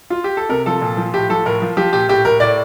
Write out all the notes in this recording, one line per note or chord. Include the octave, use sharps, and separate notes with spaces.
F4
G4
A4
C3 A#4
F3 A4
A#2
F3
A2 G4
F3 A4
A2 A#4
F3
F3 G4
A#2 G4
A2 G4
A2 A#4
A2 D5